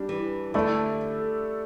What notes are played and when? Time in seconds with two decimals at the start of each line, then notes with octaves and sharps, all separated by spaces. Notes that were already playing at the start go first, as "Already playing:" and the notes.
Already playing: G3 D4 G4
0.09 E3
0.54 D3 A3 E4 A4 D5